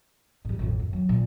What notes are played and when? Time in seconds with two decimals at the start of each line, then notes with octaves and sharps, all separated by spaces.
0.45 G#2 G3
0.59 A1 F2
0.79 F#2
0.93 F#3
1.09 A#2